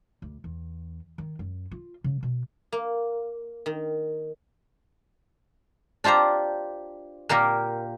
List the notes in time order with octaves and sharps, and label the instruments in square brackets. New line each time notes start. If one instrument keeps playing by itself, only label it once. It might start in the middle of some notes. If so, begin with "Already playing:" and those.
[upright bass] D2
E2
D#3
F#2
F4
C#3
B2
[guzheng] A#3
D#3
D4 F4 G4 C5 A#5
A#2 A#3 G4 A#4